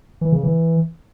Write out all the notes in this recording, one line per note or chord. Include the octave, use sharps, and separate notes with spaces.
E3
C#3
E3